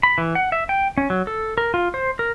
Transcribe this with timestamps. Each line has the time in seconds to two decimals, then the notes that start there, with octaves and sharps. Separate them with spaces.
0.03 B5
0.18 E3
0.35 F#5
0.52 E5
0.69 G5
0.98 C#4
1.10 F#3
1.27 A4
1.58 A#4
1.74 F4
1.94 C5
2.19 A#4